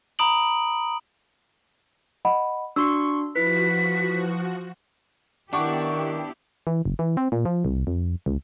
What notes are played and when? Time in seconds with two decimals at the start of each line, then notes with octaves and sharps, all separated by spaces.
0.19 A#5 B5 D#6 D7 F#7
2.25 D#5 F#5 B5
2.76 D4 F#4 C6 C#6 E6
3.35 F3 E4 F#4 B4 B6
5.53 D#3 B3 D4 E4 G4 F#5 C#6 D6
6.67 E3
6.85 F#1
6.99 E3
7.17 C4
7.32 A#2
7.45 F3
7.65 C2
7.87 F2
8.26 C#2